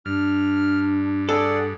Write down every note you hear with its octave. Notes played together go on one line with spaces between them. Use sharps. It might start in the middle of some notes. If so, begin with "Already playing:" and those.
G2 D4 F6
G#4 A4 D5 F#5